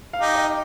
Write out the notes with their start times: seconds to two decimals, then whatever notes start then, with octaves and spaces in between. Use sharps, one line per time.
0.13 F5
0.20 D#4 G4
0.35 D#5